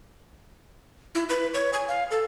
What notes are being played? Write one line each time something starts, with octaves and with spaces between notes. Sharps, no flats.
E4
B4
C#5
G#5
F5
A4